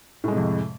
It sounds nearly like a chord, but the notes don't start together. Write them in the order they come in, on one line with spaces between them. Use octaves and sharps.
A2 G#3 C3 F2